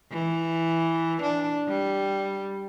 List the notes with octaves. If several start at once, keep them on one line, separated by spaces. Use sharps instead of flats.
E3
D4
G3